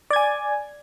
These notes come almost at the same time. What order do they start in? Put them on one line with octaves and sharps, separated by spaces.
D5 G#6 G#5